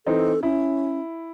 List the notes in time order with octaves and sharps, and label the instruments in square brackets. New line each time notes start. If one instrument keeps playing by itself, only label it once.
[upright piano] E3 C4 D#4 [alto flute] A4
[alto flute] C#4 [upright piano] E4